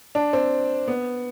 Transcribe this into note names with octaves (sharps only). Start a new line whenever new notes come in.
D4
C4
B3